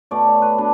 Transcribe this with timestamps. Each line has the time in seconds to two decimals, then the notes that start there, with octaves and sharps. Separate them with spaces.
0.11 B2 A3 D5
0.27 C#5
0.42 B4
0.58 B2 D4